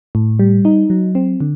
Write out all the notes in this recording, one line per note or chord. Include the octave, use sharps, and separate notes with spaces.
A2
G3
D#4
F#3
C4
D3